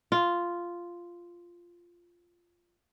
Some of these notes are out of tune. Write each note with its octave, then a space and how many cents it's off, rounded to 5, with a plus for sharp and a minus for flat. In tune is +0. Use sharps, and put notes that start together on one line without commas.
F4 -5